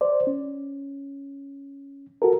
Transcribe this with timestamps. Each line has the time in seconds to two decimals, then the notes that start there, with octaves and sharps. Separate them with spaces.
0.01 C5 D5
0.27 C#4
2.22 F#4 A4 A#4